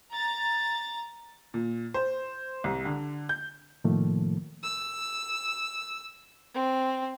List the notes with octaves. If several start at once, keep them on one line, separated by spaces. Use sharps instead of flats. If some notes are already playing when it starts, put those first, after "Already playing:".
A#5 A6
A#2
C5
C2
D3
G6
A2 C3 D#3 F3 A3 A#3
E6
C4